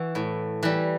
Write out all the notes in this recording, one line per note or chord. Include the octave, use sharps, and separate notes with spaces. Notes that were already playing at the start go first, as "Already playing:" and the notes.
Already playing: E3 F#4
A2
E3 G3